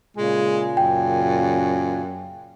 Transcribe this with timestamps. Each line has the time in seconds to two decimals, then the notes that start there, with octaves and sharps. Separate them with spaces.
0.17 A#2 C#3 G#3 G#5
0.77 F#2 G5